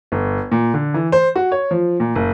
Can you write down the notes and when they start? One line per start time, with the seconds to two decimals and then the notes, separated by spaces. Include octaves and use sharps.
0.12 G1
0.52 A#2
0.74 D3
0.94 E3
1.12 C5
1.36 F#4
1.52 C#5
1.71 F3
2.00 A#2
2.15 F#1